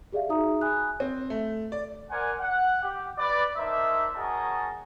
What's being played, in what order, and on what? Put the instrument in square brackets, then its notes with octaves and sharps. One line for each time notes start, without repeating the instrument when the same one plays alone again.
[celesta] G4 G#4 D5 E5 F5
D#4 F#4 G#4 E5 A#5 D#6
G#5 B5 D#6 F#6
[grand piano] C4
A3
D5
[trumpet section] A#4 C5 D5 F#5 G#5
F#5
G4
B4 D5
A#3 D4 D#4 C5 E5
C#4 F#4 G#4 A#4 D#5 A5